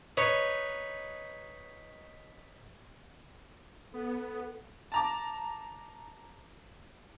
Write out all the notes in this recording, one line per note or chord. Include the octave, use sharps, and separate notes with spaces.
D#4 B4 C#5
B3 A4
A5 A#5 D6